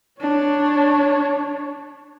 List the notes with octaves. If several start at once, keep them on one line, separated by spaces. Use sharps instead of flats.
D4 C#5